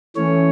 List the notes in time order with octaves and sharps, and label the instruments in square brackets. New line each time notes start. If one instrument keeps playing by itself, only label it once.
[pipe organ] E3 A3 C#4 C#5